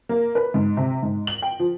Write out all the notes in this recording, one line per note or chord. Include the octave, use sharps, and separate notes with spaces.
A#3
B4
G#2
C3
G#2
F#7
G5
F3